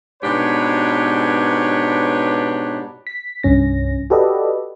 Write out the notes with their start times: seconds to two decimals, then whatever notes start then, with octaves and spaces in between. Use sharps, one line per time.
0.23 G#2 B2 D4 G4 B4 C#5
3.07 B6
3.43 C2 G2 C#4 A#6
4.10 F#4 G4 A4 B4 D5 D#5